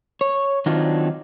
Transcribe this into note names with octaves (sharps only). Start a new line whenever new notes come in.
C#5
D#3 F#3 C4 D4 D#4 F4